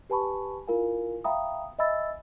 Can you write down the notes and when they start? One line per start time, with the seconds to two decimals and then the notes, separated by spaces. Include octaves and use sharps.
0.10 G4 B4 G#5 A5 B5 C#6
0.68 E4 F4 A#4 F5 G#5
1.24 E5 F5 G5 A#5 B5 D#6
1.79 D#5 E5 G#5 B5 E6 A6